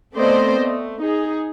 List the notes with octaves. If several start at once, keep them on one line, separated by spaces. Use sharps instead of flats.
A3 B3 C4 C5 D5 D#5
A3
D#4 G#4